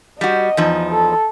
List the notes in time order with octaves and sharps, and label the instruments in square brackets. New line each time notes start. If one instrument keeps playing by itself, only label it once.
[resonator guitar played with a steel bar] G3 F#4 [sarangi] D#5
[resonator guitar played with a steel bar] E2 F3 D#4
[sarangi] A4